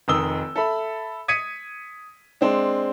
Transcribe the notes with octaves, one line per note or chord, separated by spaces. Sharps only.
F1 D#3 D#6 E6 G7
A4 E5 B5
D#6 G#6 B6 C#7 D#7
G#3 C4 D4